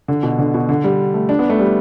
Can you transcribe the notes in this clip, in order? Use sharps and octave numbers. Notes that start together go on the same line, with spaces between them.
D3
B2
D3
B2
D3
G3
A3
D4
B3
A3
G3